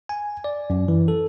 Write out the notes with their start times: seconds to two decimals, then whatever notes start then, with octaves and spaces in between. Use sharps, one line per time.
0.09 G#5
0.44 D5
0.70 F#2
0.88 E3
1.08 A4